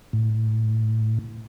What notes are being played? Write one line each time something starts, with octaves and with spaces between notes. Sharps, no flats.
A2